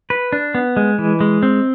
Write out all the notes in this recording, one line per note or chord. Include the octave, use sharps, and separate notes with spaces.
B4
D4
B3
G#3
E3
G#3
C4